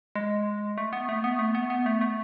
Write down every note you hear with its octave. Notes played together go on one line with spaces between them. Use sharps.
G#3
A3
B3
A3
B3
A3
B3
B3
A3
A3